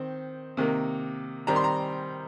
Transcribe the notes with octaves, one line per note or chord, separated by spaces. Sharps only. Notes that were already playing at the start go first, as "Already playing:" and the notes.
Already playing: D#3 C4
C3 D#3 A#3
D#3 G3 C4 A#5
C6
A#5